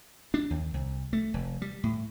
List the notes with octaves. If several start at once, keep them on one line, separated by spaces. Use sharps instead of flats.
D4
D#2
C2
A3
F1
G3
A2